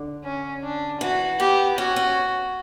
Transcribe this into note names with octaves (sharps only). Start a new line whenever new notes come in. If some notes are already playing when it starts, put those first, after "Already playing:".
Already playing: D3
C#4
D4
E3 F#4
B3 G4
C#4 F#4
C#4